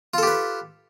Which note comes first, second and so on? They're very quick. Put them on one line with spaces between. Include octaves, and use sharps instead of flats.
F4 A4 G4 B4